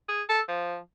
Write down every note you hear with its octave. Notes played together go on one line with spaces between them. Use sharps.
G#4
A4
F3